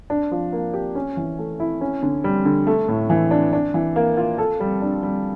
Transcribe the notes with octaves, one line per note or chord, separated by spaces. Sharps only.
D4
F3
A#3
G4
C#4
E3
A3
E4
C#4
D3
G3
D3
A3
A2
E3
D4
D4
E3
A#3
F4
A4
G3
D4
G3